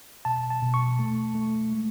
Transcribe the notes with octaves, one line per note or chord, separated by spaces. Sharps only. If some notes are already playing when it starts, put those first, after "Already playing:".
B2 A5
A5
B2
C#6
A3
A3
G#3